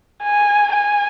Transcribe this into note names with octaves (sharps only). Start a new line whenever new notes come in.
G#5
G#5